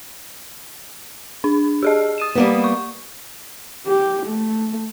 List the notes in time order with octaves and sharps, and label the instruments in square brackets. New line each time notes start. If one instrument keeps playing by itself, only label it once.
[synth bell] D4
G4 G#4 D#5
D#6 D#7 E7
[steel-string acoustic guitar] G3 A#3 B3
[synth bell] C#6
[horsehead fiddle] G4
A3